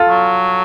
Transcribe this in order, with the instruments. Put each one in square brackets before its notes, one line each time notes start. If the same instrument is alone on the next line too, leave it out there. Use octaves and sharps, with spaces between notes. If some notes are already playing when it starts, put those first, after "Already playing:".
Already playing: [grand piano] F4 A4
[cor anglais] F#3